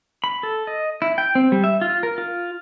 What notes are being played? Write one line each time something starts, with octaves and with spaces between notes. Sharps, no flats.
B5
A4
D#5
E4
G5
C4
G3
E5
F4
A#4
F4